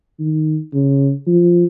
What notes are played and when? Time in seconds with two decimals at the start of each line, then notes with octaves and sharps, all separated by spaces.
0.19 D#3
0.73 C#3
1.27 F3